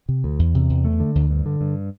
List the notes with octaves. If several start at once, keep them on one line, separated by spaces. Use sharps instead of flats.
C3
D2
E2
C3
E2
A3
D3
D2
G2
D3
G2